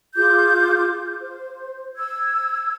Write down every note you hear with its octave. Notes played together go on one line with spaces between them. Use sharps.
F4 G#4 D6 G6
C5
E6 G#6